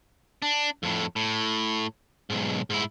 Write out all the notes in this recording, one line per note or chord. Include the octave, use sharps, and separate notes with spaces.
D4
F2 A2
A2
B1 G#2
G#2 E4